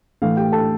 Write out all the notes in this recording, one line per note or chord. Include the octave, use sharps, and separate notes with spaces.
A2 E3 A3 F5
G4 G5
A4 A5